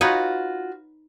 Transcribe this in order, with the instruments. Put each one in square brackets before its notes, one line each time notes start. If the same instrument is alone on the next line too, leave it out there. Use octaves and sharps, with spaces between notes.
[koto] D#4 B4 C#5 [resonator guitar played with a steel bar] F4 F#4